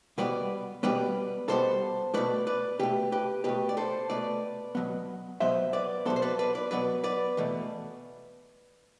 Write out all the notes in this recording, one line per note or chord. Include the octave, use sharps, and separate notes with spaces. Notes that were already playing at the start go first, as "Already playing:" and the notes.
B2 G3 B3 B4 D5
B2 G3 B3 B4 D5
B2 G3 B3 A4 C5
B2 A3 B4 D5
B4 D5
B2 A3 G4 B4
G4 B4
B2 A3 G4 B4
D5
A4 C5
B2 A3 B4 D5
B2 F#3 B3
B2 F#3 B3 C5 E5
B4 D5
B2 F#3 B3 A4 C5
C5
B4 D5
B4 D5
B4 D5
B2 F#3 B3 B4 D5
B4 D5
E2 B2 A3